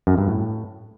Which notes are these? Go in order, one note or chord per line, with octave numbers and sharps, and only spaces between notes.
F#2
G2
A2